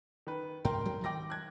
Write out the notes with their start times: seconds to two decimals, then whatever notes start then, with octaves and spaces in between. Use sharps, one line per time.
0.27 D#3 B4
0.65 G#2 A#4 G5 C6
0.85 F#3 G#3 C4
1.04 D#3 G5 D6 A#6
1.30 F#6 G#6